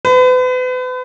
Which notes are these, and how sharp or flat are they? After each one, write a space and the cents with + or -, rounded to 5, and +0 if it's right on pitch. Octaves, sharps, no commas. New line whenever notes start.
B4 +40